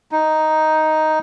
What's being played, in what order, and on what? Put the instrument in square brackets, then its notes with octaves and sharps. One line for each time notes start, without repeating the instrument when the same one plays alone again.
[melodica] D#4